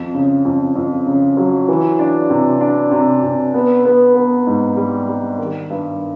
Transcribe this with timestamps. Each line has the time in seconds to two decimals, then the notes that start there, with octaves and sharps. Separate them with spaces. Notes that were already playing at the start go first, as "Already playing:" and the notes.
Already playing: F2
0.14 C#3
0.45 F2
0.75 F2
1.07 C#3
1.37 F#3
1.68 E3
1.99 D4
2.30 C3
2.61 D4
2.91 C3
3.23 C3
3.54 B3
3.85 B3
4.16 B3
4.47 G#2
4.77 G3
5.08 G3
5.38 D#3
5.70 G2